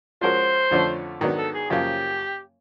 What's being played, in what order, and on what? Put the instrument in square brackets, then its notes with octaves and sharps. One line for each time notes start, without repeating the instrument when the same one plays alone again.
[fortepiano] F3 G#3 C#4 F#4 A#4 [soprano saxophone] C5
[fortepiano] F2 D3 F3 A3 C#4
G#2 D#3 F#3 B3 D4
[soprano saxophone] A4
G#4
[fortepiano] F#2 C#3 F3 A#3 [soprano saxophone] G4